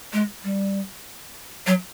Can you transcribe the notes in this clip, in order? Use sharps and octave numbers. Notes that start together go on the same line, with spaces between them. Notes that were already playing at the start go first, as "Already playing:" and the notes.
G#3
G3
F#3